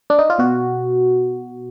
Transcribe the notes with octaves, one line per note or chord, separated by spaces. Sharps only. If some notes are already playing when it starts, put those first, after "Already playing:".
D4
D#4
F4
B2 F#4